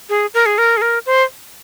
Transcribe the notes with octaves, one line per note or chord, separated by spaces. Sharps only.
G#4
A#4
G#4
A#4
G#4
A#4
C5